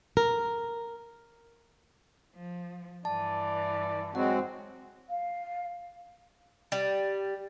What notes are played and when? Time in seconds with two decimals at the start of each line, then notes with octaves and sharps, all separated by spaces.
0.17 A#4
2.34 F3
3.05 G2 E3 D5 A5
4.15 F#3 G#3 C4 F#4 F#5
5.08 F5
6.72 G3